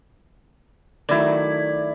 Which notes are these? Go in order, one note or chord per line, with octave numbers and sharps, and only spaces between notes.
D#3 F#3 A3 E4 D5